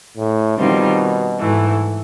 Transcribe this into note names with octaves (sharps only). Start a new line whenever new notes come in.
A2
B2 D#3 G3 C4 F4
G#2 E3 A3